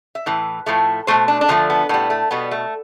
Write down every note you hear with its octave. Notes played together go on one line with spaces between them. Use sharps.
E5
A2 E3
A2 F3 A3
B2 A3 C5
D4
D4
D3 F3 A3 C4
B3
A2 G3 B3
A3
B2 G3 B3
A3